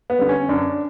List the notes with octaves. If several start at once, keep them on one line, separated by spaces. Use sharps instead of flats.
B3
D3 G3
C#4
F#2 D4